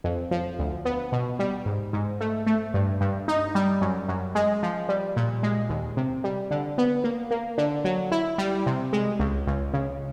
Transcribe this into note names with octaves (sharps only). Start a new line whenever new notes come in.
F2
F3
D2
B3
B2
G3
G#2
G#2
A3
A3
G2
G2
D#4
G3
F#2
F#2
G#3
F3
G3
A#2
G#3
D#2
C3
G3
D3
B3
A#3
A#3
D3
F#3
E4
G3
C3
G#3
C#2
C#2
C#3